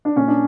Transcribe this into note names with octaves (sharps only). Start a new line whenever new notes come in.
D4
A#2 C#4
D4